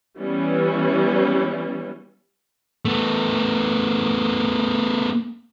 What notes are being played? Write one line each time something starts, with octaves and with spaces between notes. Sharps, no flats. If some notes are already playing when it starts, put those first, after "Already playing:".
E3 G3 B3 C#4
A3 B3